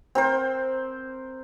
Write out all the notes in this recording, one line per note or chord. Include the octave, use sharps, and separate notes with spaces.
C4 A#4 C5